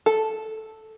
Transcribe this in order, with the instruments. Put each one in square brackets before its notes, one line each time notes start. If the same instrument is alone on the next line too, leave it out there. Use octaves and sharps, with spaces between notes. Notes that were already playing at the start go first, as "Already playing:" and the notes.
[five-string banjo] A4